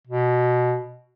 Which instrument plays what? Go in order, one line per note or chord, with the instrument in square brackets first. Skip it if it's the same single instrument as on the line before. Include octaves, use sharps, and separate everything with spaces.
[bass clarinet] B2